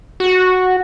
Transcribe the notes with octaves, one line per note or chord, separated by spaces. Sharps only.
F#4